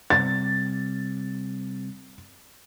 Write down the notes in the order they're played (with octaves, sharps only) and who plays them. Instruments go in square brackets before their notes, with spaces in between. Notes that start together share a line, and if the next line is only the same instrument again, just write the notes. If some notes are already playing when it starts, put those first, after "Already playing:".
[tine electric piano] C3 G3 C4 [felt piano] A6